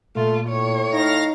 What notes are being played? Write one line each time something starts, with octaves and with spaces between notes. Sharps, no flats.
A#2 A3 F4
A2 C#5
D#4 F5 A#6